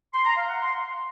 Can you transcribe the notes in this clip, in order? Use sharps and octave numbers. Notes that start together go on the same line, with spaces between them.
C6
A#5
F5
F#5
C6